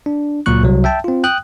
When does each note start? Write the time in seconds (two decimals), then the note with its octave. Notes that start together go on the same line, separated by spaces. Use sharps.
0.06 D4
0.46 C#2 A#2 F#3 C#6 F#6
0.63 C2 F#3
0.84 E5 G5 A5
1.04 C4 F4
1.24 G5 D#6 F#6